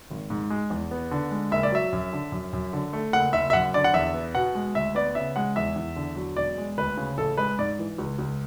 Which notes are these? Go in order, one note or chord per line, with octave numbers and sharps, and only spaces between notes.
G#1
G#2
G#3
E2
B3
D3
G#3
F#1 E5
D5
F#3 E5
F#2
D3
F#2
F#2
D3
A3
F#1 F#5
F#1 E5
E5
F#2 F#5
D3 D5
F#5
E2 E5
B3
B2 F#5
G#3
D2 E5
B3 D5
C#3 E5
G#3 F#5
E2 E5
E2
D3
F#3
E1 D5
G#3
D2 B4
C#3
A1 A4
G#3 B4
G#2 D5
E3
C#2
C#2